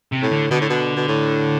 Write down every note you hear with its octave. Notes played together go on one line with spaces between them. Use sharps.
C3
A2
D3
B2 D3
A2
B2
B2
A2